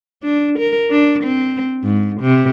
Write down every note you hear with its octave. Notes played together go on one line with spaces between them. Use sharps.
D4
A#4
D4
C4
G#2
C3